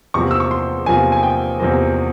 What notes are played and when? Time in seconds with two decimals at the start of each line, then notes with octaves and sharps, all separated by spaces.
0.14 E2 C3 F3 A#3 C#6
0.31 E6
0.40 C#6
0.51 C6
0.86 E2 C3 F3 A#3 G#5
1.12 G#5
1.23 G5
1.60 E2 C3 F3 A#3